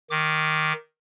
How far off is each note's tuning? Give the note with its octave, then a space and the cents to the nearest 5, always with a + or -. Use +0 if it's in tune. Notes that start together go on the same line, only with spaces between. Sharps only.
D#3 +0 D6 +0